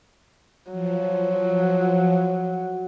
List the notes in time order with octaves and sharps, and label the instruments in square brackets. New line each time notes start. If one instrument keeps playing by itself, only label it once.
[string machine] F3 [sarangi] F#3